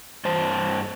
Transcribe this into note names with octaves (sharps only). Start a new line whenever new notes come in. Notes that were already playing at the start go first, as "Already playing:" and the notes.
G2 C5 A5